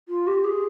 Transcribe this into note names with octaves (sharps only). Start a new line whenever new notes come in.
F4
G4
G#4